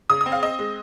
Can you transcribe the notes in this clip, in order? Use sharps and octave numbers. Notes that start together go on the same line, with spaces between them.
C#3 D#6
D#6
C4
F5
C4 D#5
G#3